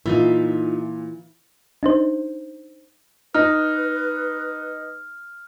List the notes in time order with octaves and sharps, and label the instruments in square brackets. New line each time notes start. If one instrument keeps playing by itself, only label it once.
[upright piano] A#2 [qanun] E3 [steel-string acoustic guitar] D#4 F4 E5
[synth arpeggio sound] D4 D#4 C5
[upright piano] D#4 [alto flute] B4 [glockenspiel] F6